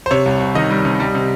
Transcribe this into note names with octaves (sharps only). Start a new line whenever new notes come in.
C5
C3 C#5
C2
C2
D#3 D#5
G3
C3
G3
C3